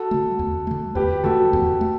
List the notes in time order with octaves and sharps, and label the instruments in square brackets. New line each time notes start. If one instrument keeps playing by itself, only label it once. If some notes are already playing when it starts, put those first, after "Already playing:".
Already playing: [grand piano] F#4 A4
[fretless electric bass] D3 A3
E2
D3 A3
[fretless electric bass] E2 [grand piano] G4 B4
[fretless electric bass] D3 A3 [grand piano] F#4 A4
[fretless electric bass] E2
A3